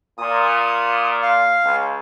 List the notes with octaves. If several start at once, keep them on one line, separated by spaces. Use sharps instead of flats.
A#2 D#6
F5
C#2